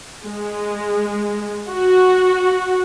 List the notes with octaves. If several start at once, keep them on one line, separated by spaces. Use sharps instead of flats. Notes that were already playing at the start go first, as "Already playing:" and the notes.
G#3
F#4